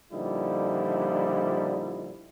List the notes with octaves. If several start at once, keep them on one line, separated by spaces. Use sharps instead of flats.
A#2 D3 F3 G3 D#4 E4